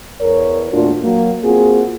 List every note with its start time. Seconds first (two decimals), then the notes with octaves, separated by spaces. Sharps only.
0.21 E2 A#4 C#5
0.72 E2 A#2 A3 D4 F4 F#4
1.03 F#3 A#3
1.44 A#3 C4 F4 F#4 G#4